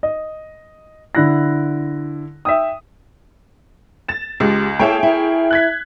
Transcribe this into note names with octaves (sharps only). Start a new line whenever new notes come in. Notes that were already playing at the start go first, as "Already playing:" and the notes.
D#5
D3 E4 F#6 A#6
E5 G5 D#6
A6 E7
C#2 G#3 G4
A#3 E4 G#4 A4 C#5 G5
E4 A#4
F#6 G#6 B6